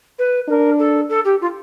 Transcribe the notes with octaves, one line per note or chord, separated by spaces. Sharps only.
B4
D4 A#4
A4
A4
G4
F4